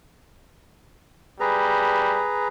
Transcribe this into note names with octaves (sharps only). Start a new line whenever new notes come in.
G3 G#4 B4 A#5